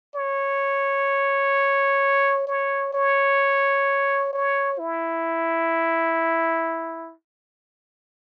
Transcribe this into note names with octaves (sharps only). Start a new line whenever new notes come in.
C#5
C#5
C#5
C#5
E4